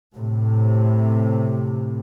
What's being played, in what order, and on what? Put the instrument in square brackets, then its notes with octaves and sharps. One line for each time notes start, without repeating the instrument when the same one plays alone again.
[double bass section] A2 C3